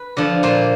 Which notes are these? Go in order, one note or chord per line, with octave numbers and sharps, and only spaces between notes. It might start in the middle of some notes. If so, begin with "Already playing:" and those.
Already playing: B4
D3 F3
A#2 C5